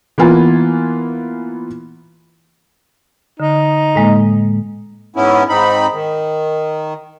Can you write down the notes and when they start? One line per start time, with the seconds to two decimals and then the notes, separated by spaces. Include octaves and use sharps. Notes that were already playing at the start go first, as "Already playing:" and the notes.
0.18 E3 A#3 B3 F4 G#5
3.40 D3 D#4
3.96 A2 G#3 A#3
5.16 G#2 B3 C#4 E4
5.49 G#2 C4 D#4 B5
5.94 D#3